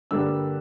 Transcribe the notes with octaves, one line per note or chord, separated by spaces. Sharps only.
G2 D3 G3 A#3 E6